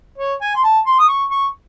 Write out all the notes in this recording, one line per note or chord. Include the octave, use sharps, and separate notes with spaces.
C#5
G#5
C6
A5
C6
D#6
C#6
C#6